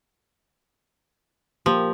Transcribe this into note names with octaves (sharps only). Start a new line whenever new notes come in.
F3 A#3 G4